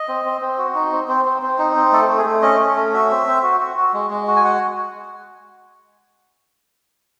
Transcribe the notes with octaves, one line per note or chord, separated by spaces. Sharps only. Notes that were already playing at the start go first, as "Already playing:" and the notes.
Already playing: D#5
C4
C4
C4
F#4
D#4
C4
C4
C4
C4
D#4
C4
A3 A4
A3
G#4
A3
C#4 D#5
C#4
A3
F#4 E5
C4
C4
F#4
F#4
F#4
G#3
G#3
F#4
G#5
G#3 F#5